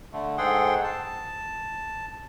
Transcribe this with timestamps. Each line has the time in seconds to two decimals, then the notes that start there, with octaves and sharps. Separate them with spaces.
0.13 D3 A3
0.38 G#2 G#4 A4 F#5 G5 C6
0.84 A5